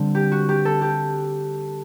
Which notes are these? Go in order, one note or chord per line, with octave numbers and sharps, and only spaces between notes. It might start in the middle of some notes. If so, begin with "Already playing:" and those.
Already playing: D3 G3 C4
G4
F#4
G4
A4
G4